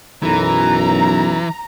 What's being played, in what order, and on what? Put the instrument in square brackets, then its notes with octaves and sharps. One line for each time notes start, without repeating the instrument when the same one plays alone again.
[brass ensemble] B1 F#2 [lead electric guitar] E3 [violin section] A#5